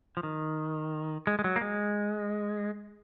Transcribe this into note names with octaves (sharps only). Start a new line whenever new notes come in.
F3
D#3
G#3
G#3
F#3
A#3
G#3